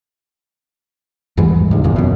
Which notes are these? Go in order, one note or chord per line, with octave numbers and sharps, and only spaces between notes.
E2 G#2 E3 G3
C#2 D#3
G1 E2 A#2 C#3
F#2 B2